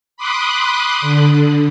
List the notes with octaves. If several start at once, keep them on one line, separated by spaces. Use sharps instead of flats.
B5 C6 D6 D#6 F#6
D3